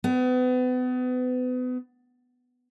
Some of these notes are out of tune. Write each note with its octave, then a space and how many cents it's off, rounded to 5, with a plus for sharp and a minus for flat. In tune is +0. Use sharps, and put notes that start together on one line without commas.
B3 +35